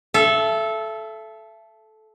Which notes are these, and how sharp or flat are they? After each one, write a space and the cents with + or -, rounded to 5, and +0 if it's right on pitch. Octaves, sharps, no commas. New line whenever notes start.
A4 -15 E5 +30